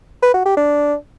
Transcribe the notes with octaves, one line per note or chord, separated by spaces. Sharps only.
B4
F#4
G4
D4